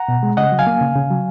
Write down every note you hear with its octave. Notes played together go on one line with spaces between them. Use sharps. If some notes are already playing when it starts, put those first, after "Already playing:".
Already playing: F#5 A#5
B2
G#3
C#3 D#5 F#5
F#3
F5 G#5
A#3
C#3
C#3
F#3